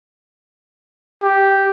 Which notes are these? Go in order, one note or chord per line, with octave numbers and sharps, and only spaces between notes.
G4